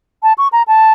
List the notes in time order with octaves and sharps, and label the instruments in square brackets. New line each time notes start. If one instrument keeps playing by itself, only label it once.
[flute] A5
C#6
A#5
A5